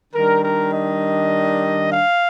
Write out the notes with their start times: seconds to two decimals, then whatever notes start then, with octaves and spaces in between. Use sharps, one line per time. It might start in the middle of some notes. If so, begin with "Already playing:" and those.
0.14 D#3 G3 D4 A#4
0.44 A#4
0.73 D#5
1.92 F5